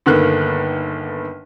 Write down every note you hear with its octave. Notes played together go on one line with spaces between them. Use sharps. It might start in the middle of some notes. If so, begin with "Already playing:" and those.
G1 D3 D#3 A#3 B3 F#6